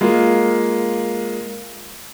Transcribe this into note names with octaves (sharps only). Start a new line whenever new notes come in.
G#3 A#3 F4